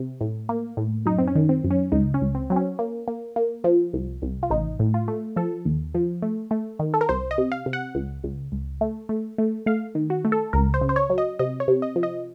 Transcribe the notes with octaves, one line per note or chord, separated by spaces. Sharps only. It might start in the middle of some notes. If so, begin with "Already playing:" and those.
Already playing: C3
A2
A#3
A2
F#2 D#4
C4
C#4
D#3
C4
F#2
C#4
C#2 D#4
C#4
C#2
C4
F#3 C4
C#4
A#3
A#3
A#3
F3
C2
C2
F4
A1 D#4
A2
F4
A3
F3 A4
D#2
F3
A3
A3
D#3
A4
A#4
C2 C5
D#5
C3
F5
C3
F#5
C#2
C#2
C#2
A3
A3
A3
A3 F5
D#3
F#4
A3
A4
C#2 A#4
C5
C#3
C5
C#5
F#3
D#5
C3 D#5
C#5
C3
D#5
F3
D#5